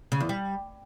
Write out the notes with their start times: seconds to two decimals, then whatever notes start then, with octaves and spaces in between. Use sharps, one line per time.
0.12 C#3
0.20 E2
0.29 G3